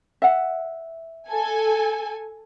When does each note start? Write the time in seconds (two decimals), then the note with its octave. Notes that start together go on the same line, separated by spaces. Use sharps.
0.22 E5 F#5
1.29 A4 G#5